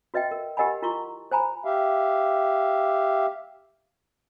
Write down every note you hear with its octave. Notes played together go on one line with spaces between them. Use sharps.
F#4 B4 D#5 E5 G5
A#4
G4 A#4 D#5 F#5 G#5 B5
E4 F4 A#4 A#5 C6 C#6
C5 G#5 A#5 B5
G4 E5 F5